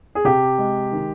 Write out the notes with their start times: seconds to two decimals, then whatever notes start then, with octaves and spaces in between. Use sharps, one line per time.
0.15 G#4
0.25 C3 G4
0.59 G#3
0.93 D#3